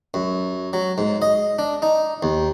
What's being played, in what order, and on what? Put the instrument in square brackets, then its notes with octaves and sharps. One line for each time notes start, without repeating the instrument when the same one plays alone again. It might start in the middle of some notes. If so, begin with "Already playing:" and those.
[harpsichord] F#2
F#3
G#2
D#5
D4
D#4
D#2